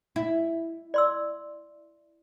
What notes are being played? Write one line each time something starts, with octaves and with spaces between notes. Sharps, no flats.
E4
D5 C6 E6